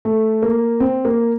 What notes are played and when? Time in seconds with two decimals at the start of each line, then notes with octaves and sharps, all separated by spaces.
0.05 A3
0.42 A#3
0.80 C4
1.05 A#3